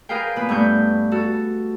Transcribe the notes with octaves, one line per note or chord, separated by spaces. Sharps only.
G#4 A#4 B4 F5 G5
A#2 B3 B4
G2 A3 B3 C#6 G6
F#4 A4